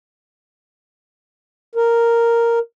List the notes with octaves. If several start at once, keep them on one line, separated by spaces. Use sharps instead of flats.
A#4